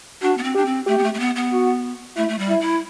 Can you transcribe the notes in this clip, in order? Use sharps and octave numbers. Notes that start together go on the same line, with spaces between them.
D4 F#4
B3
C4
D4 G4
C4
A3 G4
B3
A3
A3
B3
B3
F#4
A3 E4
A3
G3
E4
E4